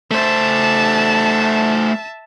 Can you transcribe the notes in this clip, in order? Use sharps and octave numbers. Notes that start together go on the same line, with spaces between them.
A3 C5 E5 A5